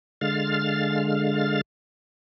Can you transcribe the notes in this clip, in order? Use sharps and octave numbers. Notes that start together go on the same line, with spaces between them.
D3 G#3 F5 F6 A6